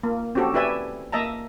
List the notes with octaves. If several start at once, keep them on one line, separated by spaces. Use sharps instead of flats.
A#3
C4 C#4 F#4 G4 A4
E4 G4 B4 D5 E5 G#5
A#3 D#5 E5 A5 A#5